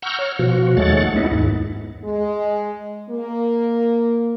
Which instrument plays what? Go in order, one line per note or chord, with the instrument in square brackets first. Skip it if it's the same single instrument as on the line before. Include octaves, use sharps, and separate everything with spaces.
[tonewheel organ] F#5 A#5 C#6 E6 F6 G6
C#5 F6
B2 F3 F#4
D#2 G#3 A3 C#5 F#5 A6
G#3 B3 D#4 E4
D#2 G#2
[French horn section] G#3
A#3